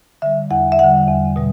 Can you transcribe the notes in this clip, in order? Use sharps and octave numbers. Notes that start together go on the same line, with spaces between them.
D3 G3 E5
E2 F#5
E5
D3 G3 F#5
E2
B2 G3